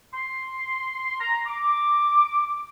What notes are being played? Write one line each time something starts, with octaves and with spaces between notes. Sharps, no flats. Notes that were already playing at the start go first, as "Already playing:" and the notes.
C6
A#5
D6